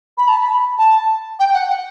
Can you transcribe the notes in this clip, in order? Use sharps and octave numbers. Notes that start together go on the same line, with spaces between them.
B5
A5
B5
A5
G5
F#5
F#5